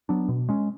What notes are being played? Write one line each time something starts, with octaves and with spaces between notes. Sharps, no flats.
F#3 B3 D4
B2
G#3 C#4